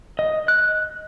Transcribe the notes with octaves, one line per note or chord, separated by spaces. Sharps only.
D#5
F#6